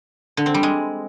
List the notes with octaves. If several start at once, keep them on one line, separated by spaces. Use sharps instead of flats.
D3
C4
G3
G#3